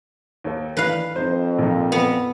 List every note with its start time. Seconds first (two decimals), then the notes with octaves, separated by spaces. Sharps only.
0.44 D#2 A4
0.77 D#3 E3 D4 B4 F5
1.16 F2 D#4 C5
1.58 A#1 A#3 D#4
1.92 B3